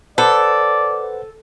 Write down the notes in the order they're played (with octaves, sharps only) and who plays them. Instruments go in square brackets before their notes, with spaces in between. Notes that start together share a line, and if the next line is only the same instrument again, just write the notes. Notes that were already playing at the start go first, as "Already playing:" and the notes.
[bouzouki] A4 [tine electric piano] B4 C5 F#5 [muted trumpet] D5